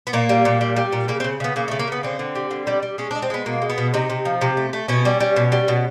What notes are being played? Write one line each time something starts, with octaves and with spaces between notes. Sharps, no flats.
B3
A#2 A#3
G3
A#2
G3
G3
A#2
C#3 A#3
C4
C#3
C#3 B3
C#3 A#3
A3
C#3
A#3
C#3 B3
D3 C4
D3
G3
D3
G3
G3
G#3 C#4
D4
G#3
C4
G#3 B3
B2 A#3
G#3
B3
B2
C3 D#4
C3
F3
C3
A3
A3
B2 C#4
G3
G3
B2
G3
B2